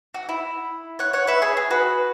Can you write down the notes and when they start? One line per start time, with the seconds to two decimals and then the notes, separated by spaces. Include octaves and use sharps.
0.14 F#4
0.29 E4
0.99 C#5 F#5
1.13 C#5 F#5
1.27 B4 E5
1.42 G#4 C#5
1.57 G#4
1.71 F#4 B4